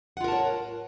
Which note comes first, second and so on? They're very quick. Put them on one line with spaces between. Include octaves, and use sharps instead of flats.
F#5 F4 A#4 A5 C#5